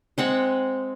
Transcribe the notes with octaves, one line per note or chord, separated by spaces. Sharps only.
G#3 C4 F#5